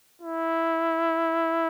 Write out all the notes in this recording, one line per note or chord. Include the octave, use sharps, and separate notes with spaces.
E4